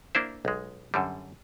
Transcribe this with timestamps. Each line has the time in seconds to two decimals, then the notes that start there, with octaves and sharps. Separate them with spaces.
0.15 A#3 D4 E4 C5
0.45 B1 G#3
0.94 F#2 D3 G3